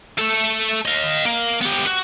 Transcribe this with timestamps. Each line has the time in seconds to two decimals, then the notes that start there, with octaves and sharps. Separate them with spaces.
0.19 A3 A4
0.86 D#5 F5
1.25 A#3
1.61 B3 G4
1.86 F#4